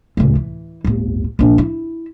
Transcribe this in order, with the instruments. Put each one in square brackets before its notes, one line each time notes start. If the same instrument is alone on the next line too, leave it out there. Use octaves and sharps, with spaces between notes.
[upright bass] C#2 A2
E3
D1 G1
A#1 D4
E4